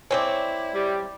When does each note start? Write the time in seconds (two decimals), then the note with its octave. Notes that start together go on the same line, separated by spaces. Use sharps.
0.11 G#3 C4 E4 C#5 D5
0.74 G3